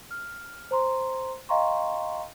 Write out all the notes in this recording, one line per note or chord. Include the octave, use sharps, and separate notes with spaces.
F6
C5 A#5 C6
D#5 F5 G5 A#5 C6 C#6